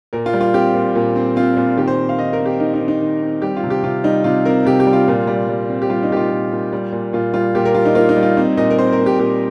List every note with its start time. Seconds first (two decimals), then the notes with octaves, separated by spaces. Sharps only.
0.13 A#2 A#4
0.26 F4
0.33 G3
0.41 F4
0.54 C4 G4
0.75 A#2
0.95 A#2
1.16 C4
1.36 C4 F4
1.57 A#2
1.77 D#3 G4
1.88 C5
1.98 C4
2.09 F5
2.19 D#3 D#5
2.33 A#4
2.40 C4
2.46 G4
2.60 D#3 D#4
2.74 D#4
2.81 D#3
2.88 D#4
3.01 D#3
3.22 C4
3.42 G3 G4
3.57 F4
3.63 C3
3.70 G4
3.83 C3 F4
4.04 G3 D#4
4.24 C3 F4
4.45 C4 A#4
4.65 C3 G4
4.80 G4
4.87 G3
4.93 F4
5.08 A#2
5.27 G3
5.49 G3
5.69 C4
5.82 G4
5.90 G3 F4
6.03 D#4
6.11 A#2 G4
6.17 F4
6.31 A#2
6.52 A#2
6.73 G3
6.92 A#2
7.13 A#2 F4
7.34 G3 F4
7.55 A#2 G4
7.65 A#4
7.75 G3 F4
7.85 D#4
7.95 A#3 F4
8.09 D#4
8.17 G3
8.23 F4
8.37 C4 D#4
8.57 A#2 D#5
8.70 A#4
8.78 C4 C5
8.93 A#4
8.99 A#2
9.06 G4
9.19 A#2 G4